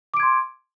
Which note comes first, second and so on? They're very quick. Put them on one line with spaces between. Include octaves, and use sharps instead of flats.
D6 D7 G#6 C6